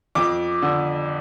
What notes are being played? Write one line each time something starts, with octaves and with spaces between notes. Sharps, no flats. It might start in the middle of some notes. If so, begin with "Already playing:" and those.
F2 D6
D3